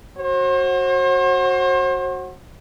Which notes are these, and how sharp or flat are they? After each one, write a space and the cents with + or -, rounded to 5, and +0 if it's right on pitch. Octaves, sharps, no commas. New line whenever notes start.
F#4 +0 C5 +40